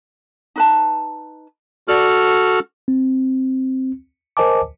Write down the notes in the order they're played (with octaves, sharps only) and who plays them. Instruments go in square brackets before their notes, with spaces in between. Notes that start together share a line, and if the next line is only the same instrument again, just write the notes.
[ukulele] D#4 B4 A5
[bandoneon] F#4 A4 F6 [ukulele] D5
[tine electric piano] C4
A#4 C5 D#5 G#5 A5 D6